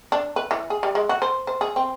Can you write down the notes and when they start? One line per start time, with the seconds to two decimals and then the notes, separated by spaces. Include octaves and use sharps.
0.12 D4
0.36 B4
0.51 E3
0.70 G#4
0.83 G3
0.95 G#3
1.09 F#4
1.22 C5
1.47 C5
1.61 G#4
1.76 C4